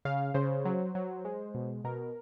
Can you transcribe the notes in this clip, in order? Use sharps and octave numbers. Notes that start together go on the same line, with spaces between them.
C#3 F5
C#3 C5
F#3
F#3
G#3
B2
B2 A#4